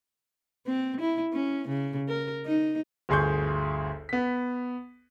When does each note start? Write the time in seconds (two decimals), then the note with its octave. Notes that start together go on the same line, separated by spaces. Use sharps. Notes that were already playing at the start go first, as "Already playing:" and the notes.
0.66 C4
1.01 E4
1.33 C#4
1.68 C#3
2.09 A#4
2.45 D#4
3.09 G1 D2 G#4 C6 C#6 G6
4.09 B3 B6